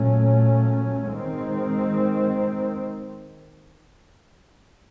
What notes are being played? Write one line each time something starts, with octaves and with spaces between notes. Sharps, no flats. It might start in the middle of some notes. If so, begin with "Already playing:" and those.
Already playing: A#2 F#3 A3 C#4
D#3 G#3 C4